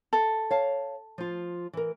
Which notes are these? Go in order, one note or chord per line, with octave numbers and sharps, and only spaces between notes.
A4
C#5 F5 A5
F3 F4
E3 A#4